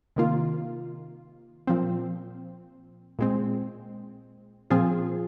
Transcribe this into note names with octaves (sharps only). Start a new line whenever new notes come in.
C3 D#3 A#3 F4
A#2 F3 C4
A#2 G#3 C4
A#2 F3 C4 F4 G#4